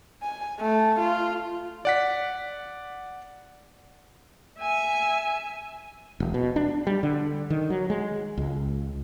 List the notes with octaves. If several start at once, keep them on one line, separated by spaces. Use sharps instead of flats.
G#5
A3
F4
D5 F#5 B6
E5 G#5
E1
B2
D4
G3
D3
D#3
F#3
G#3
C#2